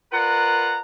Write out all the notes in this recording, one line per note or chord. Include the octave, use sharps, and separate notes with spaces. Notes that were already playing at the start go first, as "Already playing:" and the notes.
F4 A#4 B4 D5 F#5 A#5